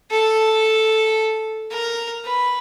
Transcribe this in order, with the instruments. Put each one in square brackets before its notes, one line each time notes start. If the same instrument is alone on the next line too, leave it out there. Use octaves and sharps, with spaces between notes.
[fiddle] A4
A#4
B4